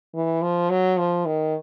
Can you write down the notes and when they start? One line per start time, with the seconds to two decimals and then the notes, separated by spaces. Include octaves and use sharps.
0.14 E3
0.42 F3
0.70 F#3
0.98 F3
1.26 D#3